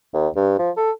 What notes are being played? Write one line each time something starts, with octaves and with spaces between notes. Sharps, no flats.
D#2
G2
F3
A4